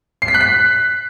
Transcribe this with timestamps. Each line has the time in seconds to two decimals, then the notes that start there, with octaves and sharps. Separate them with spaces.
0.22 C7
0.28 B6
0.34 F#6
0.41 B6